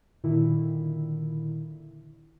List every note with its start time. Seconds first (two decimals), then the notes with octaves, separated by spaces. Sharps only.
0.24 A#2 D3 D#3 E4